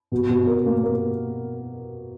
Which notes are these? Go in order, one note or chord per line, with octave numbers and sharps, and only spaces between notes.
B2
B2
A#4
A#3
A#4